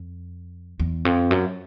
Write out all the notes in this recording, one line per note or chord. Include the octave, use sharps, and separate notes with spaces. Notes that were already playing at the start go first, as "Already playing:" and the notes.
Already playing: F2
E2
F2
F#2